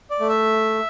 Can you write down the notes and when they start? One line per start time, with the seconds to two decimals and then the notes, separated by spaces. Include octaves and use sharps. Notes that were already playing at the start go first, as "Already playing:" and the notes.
0.11 D5
0.20 A3
0.29 E5